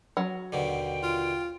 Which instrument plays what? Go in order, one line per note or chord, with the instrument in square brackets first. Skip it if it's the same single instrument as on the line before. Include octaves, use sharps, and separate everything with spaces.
[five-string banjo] F#3
[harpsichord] D#2 B2 D3 [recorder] G5
[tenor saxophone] F4